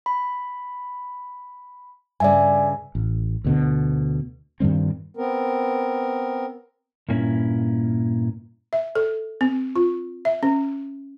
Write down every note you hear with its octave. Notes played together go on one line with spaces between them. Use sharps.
B5
G2 C#3 D5 E5 G#5
A1
D2 B2 D3
G2 D#3 G3 C4
B3 C4 A#4
G2 A#2 A#3 C#4 E4
E5
A4
C4
F4
E5
C#4